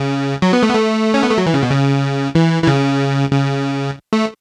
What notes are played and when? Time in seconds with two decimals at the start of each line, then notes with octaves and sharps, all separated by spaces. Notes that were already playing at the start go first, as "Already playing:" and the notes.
Already playing: C#3
0.42 F#3
0.53 B3
0.63 A3
0.69 B3
0.74 A3
1.14 C#4
1.23 B3
1.30 A3
1.38 F#3
1.46 E3
1.54 C#3
1.63 B2
1.70 C#3
2.35 E3
2.63 E3
2.67 C#3
3.32 C#3
4.13 A3